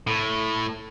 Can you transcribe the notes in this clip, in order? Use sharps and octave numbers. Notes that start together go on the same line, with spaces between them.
A2